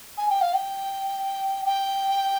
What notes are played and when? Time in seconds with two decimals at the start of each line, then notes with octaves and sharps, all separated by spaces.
0.18 G#5
0.30 G5
0.41 F5
0.54 G5
1.66 G5